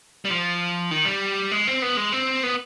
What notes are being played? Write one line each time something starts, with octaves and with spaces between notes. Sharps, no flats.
G3
F3
D#3
G3
G#3
C4
B3
G#3
C4
B3